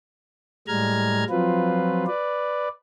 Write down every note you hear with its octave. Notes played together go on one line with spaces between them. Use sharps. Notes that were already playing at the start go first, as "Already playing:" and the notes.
A2 G3 G#3 A#5 F6 G#6
F3 F#3 C4 F4 B4
B4 D5